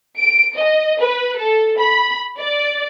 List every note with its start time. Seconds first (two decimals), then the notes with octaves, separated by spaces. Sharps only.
0.17 D7
0.55 D#5
1.00 B4
1.37 A4
1.78 B5
2.38 D5